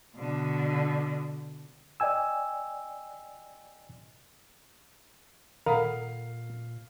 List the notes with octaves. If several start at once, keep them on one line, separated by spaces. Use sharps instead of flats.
B2 D3
D5 D#5 G5 G#5 E6
A#2 D#3 A4 A#4 F5 F#5